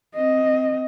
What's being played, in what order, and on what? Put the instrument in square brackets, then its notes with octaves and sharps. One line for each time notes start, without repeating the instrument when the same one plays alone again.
[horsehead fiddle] C4 D#5